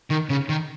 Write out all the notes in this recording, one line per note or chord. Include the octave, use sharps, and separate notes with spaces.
D#3
C#3
D#3